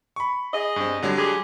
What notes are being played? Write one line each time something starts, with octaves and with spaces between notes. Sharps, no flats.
B5 C#6
G#4 D#5
G2 C4
D3 F#3 G3
G#3 G4 G#4